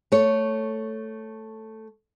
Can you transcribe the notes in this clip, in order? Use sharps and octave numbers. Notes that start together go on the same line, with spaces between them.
A3 C#5